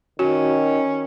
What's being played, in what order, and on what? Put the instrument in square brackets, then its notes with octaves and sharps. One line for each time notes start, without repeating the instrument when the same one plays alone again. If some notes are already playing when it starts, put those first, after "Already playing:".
[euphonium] D#3 [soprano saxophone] C#4 [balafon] F#4